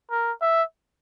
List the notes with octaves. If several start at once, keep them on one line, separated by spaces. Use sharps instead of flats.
A#4
E5